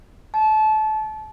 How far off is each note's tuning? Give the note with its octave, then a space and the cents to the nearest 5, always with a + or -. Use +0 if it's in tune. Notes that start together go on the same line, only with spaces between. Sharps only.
A5 -25